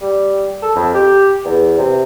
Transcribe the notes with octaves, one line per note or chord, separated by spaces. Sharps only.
G3
A4
F2
G4
E2
C3